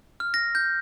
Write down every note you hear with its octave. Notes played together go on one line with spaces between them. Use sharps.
F6
A#6
G6